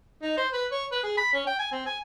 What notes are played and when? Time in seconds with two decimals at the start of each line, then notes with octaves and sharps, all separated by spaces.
0.22 D#4
0.37 C5
0.53 B4
0.71 C#5
0.92 B4
1.03 G#4
1.17 B5
1.33 C#4
1.47 G5
1.59 G#5
1.72 C4
1.86 G#5